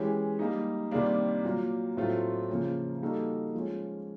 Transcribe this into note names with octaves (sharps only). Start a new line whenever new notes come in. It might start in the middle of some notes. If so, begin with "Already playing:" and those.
Already playing: E3 G#3 C#4 E4 G4
G3 A#3 D#4
C3 D#3 G3 A#3 D4
A#2 F#3 A#3
A2 F#3 A3 C4 F4
C#3 F3 A#3 C#4
G3 A#3 D#4 F#4 A4
F3 G#3 C#4